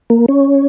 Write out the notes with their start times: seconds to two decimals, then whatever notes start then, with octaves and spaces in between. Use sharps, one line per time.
0.10 A#3
0.28 C#4